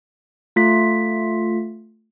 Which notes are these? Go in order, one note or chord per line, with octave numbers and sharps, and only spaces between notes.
A3 F4 B6